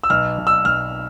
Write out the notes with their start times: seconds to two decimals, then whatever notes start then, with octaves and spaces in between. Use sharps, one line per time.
0.04 E6
0.10 B1 F6
0.38 B1
0.47 E6
0.65 B1 F6